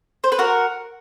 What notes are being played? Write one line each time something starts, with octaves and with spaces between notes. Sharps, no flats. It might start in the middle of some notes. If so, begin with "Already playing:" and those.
C5
B4
F#4 A#4